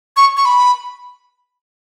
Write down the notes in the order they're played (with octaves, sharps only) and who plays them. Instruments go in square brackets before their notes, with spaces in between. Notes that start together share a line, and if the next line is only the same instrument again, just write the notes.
[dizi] C#6
C#6
B5